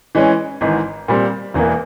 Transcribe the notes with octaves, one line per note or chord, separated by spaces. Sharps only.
E3 G#3 C#4
G#1 G#2 E3
A#2 G3 C4
E1 E2 E3 A#3 E4